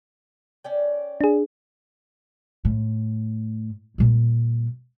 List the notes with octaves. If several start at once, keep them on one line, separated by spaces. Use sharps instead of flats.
C#4 D5 G5
D4 G#4
A2
A#2 G3